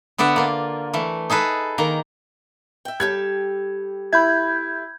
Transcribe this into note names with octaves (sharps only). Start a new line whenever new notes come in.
D3 B3 D5 E5 F#5
A#3 F4
E3 A3
D#4 G#4 A4 B4
D#3 A#3 A#5
E5 G5
G3 G4 A4 G#6
E4 B5 G6 G#6